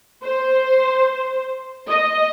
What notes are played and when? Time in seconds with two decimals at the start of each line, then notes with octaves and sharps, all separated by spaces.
0.24 C5
1.89 D#5